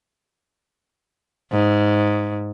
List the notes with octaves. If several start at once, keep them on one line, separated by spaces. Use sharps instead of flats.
G#2